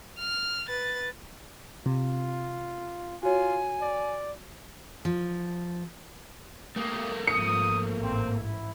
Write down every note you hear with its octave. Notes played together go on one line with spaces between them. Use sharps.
F6
B4 A6
C3 F4
F4 F#4 C#5 G#5
D5
F3
A3 A#3 G4 D#6
G#2 F3 D#6 C#7
A1 G#2 C4
E4